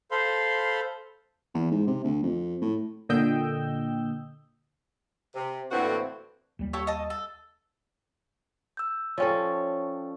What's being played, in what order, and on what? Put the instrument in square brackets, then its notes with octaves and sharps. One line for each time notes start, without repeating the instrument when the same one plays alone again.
[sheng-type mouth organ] A4 C5 F5 B5 C6
[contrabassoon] E2
G#2
C3
D2
F2
A2
[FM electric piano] A#2 D3 D#5 G5 E6 G6
[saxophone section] C3
[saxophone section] A2 C4 F#4 [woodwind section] D3 E3 A#3
[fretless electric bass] D#2 G3
[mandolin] G4 A4 C#5
D#5 A5
A4
[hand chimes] E6 G6
[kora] F3 C#4 A4 [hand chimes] C#5 D5 G5